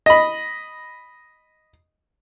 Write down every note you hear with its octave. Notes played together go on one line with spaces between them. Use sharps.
D#5 B5